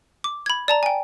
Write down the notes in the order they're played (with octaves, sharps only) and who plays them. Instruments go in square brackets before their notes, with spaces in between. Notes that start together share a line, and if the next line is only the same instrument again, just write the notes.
[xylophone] D6
B5 G#6
D5 A5 A#5
G5 G#5